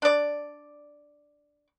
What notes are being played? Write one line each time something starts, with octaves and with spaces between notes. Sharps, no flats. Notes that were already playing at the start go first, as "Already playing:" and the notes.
D4 D5